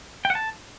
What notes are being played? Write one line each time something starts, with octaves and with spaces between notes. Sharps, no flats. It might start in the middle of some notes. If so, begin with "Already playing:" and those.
G5
F#5
A5